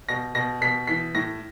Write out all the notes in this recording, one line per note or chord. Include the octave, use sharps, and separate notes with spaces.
B2 A#6
B2 A#6
B2 B6
E3 B6
A2 A#6